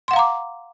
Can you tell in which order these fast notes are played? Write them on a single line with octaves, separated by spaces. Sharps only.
C6 F#5 F5 A#5 D6